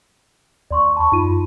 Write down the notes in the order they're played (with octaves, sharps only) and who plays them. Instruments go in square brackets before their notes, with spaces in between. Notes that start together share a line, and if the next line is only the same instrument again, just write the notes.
[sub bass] D#2 [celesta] D5 C6 C#6
[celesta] A5 B5 C#6
[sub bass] F#2 [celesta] D#4 F4 D#7